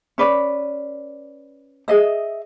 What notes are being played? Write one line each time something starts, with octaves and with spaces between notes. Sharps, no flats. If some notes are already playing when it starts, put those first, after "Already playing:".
C#4 B4 D5
G#4 D#5 E5